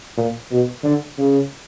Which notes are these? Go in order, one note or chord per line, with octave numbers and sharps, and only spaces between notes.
A#2
B2
D3
C#3